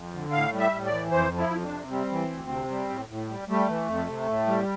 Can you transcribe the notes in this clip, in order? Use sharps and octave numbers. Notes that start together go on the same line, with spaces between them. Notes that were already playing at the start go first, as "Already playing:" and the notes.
Already playing: F2
D3
A2 F5
G3
E5
A2
D5
E3
F2 C5
F3
E4
F2
D4
C3
G3 C4
E3
D2
C3
G3
A2
A2
G3
G3 A3
E3
F2
C3
A2
G3